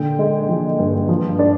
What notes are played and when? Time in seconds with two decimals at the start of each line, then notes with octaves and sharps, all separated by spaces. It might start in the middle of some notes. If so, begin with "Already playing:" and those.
Already playing: A#2 D3 G5
0.19 G#3
0.49 F3
0.79 G2
1.09 F3
1.39 D4